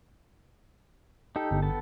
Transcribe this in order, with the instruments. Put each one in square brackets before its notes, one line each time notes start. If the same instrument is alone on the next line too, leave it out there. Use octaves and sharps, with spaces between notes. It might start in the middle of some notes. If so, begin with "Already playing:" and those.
[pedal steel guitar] D#4 G4 A4
[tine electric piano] G1
[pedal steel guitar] B3 A4 A5